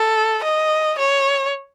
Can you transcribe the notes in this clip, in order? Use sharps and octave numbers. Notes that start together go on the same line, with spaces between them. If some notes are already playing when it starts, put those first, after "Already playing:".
Already playing: A4
D#5
C#5